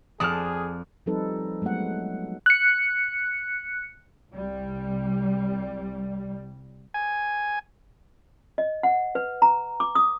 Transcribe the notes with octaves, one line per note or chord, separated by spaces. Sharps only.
F2 G#4 D5 A5 D#6 F6
F3 G3 C4 D#4 A4 B4
F#3 G#3 A3 B3 F#5
F#6 C#7
C2 G3
G#5
D#5
F#5
B4
A#5
D6
D#6